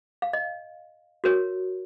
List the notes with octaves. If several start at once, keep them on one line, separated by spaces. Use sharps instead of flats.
F5
D#5
F#4 A#4 C#5